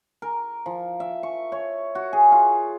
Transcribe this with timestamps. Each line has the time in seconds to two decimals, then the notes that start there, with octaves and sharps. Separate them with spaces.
0.22 A#4
0.66 F3
1.00 E5
1.23 C#6
1.52 C#5
1.95 F#4
2.13 G#4
2.32 F4